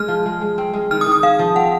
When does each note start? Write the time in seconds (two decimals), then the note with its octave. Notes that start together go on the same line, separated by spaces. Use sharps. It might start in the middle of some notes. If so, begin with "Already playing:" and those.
Already playing: G#3 F6
0.08 F3
0.26 G#3
0.41 G#3
0.58 C4
0.74 G#3
0.91 D#3 F6
1.01 D#6
1.06 D#3
1.12 D#6
1.23 G#4 F5
1.39 F3
1.56 C4 F#5